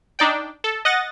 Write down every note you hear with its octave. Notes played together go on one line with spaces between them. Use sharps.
D4 D#4 D5 G5
A4
D#5 F#5 A6 A#6